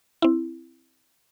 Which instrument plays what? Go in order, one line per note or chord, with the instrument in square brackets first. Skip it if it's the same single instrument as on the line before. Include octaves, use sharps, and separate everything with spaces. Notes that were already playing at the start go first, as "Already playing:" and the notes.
[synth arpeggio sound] C4 E4